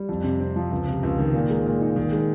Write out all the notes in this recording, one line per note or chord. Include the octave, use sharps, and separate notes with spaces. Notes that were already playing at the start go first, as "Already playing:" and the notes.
Already playing: G3
F2
C3
C4
F3
C#2
C3
C#2
D#3
A#2
G#3
A#2
D#4
D#3
G#3